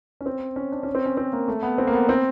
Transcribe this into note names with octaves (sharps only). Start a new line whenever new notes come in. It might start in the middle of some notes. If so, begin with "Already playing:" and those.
C#4
C4
C#4
D4
C#4
C4
C#4
C4
A#3
A3
B3
C4
A#3
B3
C4